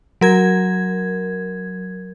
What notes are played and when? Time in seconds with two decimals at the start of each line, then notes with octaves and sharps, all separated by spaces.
0.21 F#3 A#4 G#6